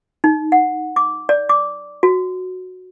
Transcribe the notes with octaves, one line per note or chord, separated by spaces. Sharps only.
D#4
F#5
D6
D5
D6
F#4